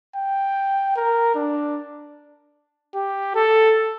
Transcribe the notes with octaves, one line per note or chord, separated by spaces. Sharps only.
G5
A#4
D4
G4
A4